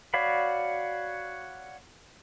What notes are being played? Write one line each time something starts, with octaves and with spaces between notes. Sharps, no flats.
F#4 C#5 D5 F5 B5